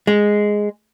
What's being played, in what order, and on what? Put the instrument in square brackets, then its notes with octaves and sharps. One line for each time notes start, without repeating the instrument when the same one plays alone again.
[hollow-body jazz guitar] G#3